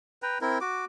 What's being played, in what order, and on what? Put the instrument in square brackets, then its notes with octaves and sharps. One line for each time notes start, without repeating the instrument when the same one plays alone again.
[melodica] B4 G5 A#5
C4 E4 A#4
F#4 D6